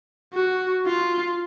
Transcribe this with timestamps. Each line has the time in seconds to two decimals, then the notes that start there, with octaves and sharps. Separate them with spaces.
0.34 F#4
0.86 F4